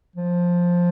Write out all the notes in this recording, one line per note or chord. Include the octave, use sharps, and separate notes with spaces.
F3